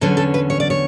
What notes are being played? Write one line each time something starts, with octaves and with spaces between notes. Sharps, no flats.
E2 D3 F#3 C#4 A4
A4
B4
C#5
D5
C#5